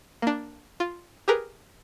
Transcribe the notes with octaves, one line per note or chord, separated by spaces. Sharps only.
A#3 D4
F4
G4 G#4 A#4 B4